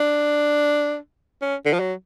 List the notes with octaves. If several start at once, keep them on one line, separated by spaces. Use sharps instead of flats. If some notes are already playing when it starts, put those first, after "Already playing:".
Already playing: D4
C#4
D3
F3
F#3